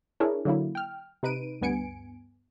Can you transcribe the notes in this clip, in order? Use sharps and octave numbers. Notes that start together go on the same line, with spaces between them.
D4 E4 G#4 A#4 C#5
D3 F#3 A#3 E4
G5 F6
C3 D#4 B4 D7 D#7
D2 G2 B3 G#5 C#7 D7